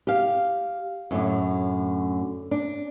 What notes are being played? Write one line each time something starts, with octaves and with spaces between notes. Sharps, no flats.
G4 F5
F#2 A2 D3
D4